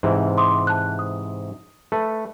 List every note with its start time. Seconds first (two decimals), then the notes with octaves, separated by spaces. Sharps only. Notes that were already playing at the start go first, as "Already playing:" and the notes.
0.03 G#2 C3 E3
0.38 C6 D6 D#6
0.67 A5 F#6
0.99 D#6
1.92 A3 A4 B4